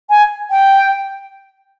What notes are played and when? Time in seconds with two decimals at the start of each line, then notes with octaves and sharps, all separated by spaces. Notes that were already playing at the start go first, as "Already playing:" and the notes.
0.10 G#5
0.51 G5